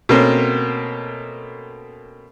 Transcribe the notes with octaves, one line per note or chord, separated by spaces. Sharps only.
B2 A3 A#3 C4 C#4